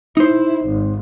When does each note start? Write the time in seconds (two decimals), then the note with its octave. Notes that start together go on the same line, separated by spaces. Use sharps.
0.17 D#4 E4 C5
0.66 G#1